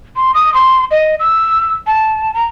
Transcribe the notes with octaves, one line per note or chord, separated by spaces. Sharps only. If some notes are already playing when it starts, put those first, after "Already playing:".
C6
D#6
C6
D#5
E6
A5
A#5